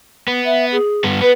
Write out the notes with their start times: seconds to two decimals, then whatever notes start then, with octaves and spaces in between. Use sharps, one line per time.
0.28 B3
0.45 E5
0.72 G#4
1.04 G2 B3
1.21 B3 B4